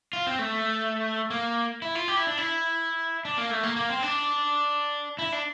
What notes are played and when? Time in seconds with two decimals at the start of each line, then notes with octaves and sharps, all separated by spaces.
0.13 F4
0.27 C4
0.39 A3
1.30 A#3
1.82 E4
1.95 F4
2.08 G4
2.17 E4
2.27 D4
2.37 E4
3.25 D4
3.38 A#3
3.51 A3
3.63 A#3
3.76 A#3
3.89 C4
4.03 D4
5.19 E4
5.32 D4